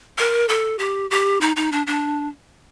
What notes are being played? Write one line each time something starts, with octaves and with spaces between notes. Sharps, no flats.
A#4
A4
G4
G4
D#4
D#4
D4
D4